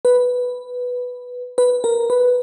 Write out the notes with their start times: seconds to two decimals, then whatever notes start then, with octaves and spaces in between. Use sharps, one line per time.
0.05 B4
1.58 B4
1.84 A#4
2.10 B4